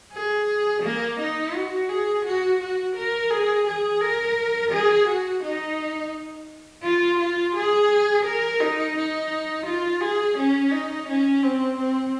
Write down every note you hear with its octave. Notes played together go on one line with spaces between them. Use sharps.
G#4
A#3
D#4
F#4
G#4
F#4
F#4
A#4
G#4
G#4
A#4
G#4
F#4
D#4
F4
F4
G#4
A#4
D#4
D#4
F4
G#4
C#4
D#4
C#4
C4
C4